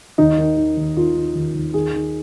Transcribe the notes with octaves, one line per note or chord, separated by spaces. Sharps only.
D#2 D#4
D#3
D#3
D#2
D#3 F4
D#3
D#2
D#2
D#3 G#4
D#3